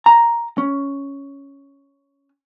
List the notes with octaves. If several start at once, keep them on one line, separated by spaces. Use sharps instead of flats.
A#5
C#4